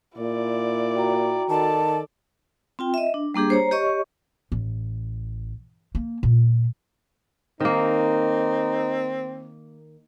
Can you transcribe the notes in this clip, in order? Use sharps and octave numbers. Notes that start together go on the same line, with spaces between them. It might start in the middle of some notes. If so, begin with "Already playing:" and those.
A#2 E4 D5
F#4 G5 A#5
D#3 A4 D5 A5
C4 F4 G5
D#5 E5
D4
G3 A#3 D4 G4 G#4
C5 C#5 A#5
G4 C#5 D#5 C#6
A1
A#3
A#2
D#3 A#3 C4 D#4